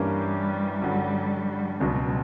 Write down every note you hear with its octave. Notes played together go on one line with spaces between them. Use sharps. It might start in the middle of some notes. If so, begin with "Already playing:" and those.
Already playing: G2 E3 G3 A#3 C#4 G4
G2 D3 F#3 C#4 F#4
C#2 B2 F#3 G3 C#4